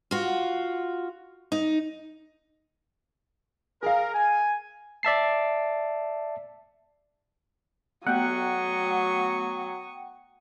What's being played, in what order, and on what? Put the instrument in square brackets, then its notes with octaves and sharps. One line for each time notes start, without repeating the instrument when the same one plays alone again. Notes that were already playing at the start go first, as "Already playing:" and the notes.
[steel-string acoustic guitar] F4 F#4
D#4
[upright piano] G#4 F5 [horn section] A#4
[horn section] G#5
[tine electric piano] D5 E5 A5 C7
[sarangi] F#3 [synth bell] A3 B3 [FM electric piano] F#5 G5 [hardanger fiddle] C#6 D#6